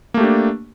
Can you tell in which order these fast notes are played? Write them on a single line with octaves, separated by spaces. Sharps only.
A#3 A3 G4 D4